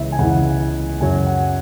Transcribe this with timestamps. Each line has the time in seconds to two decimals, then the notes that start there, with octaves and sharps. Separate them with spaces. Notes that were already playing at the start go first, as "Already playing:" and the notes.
Already playing: C#2 C#3 E3 E5
0.12 G#5
0.19 C#2 C#3 E3 F#5
1.00 F#2 C#3 F#3 G#5
1.27 F#5